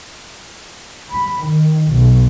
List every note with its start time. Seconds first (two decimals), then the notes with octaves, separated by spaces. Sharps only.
1.11 B5
1.45 D#3
1.91 B1